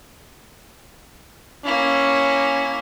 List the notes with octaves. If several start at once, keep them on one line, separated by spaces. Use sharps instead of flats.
A#3 C#4 E4